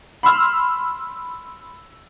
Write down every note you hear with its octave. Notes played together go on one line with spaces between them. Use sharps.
B5 C6 E6 F6